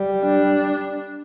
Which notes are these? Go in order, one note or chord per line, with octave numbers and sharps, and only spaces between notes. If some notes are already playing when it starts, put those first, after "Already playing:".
Already playing: G3
D4